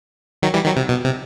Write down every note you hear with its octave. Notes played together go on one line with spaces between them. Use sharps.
D#3 F#3
E3 G3
D#3 F#3
C3
B2
C3